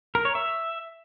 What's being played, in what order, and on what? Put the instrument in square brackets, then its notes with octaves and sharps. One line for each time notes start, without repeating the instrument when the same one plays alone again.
[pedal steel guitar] A#4
C#5
E5